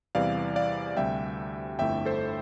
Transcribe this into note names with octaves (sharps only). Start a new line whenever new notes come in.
E2 C3 E3 G3 D5 F5
D5 F5
D2 C3 G3 E5 G5
G1 F2 D3 A3 E4 E5 G5
A4 C5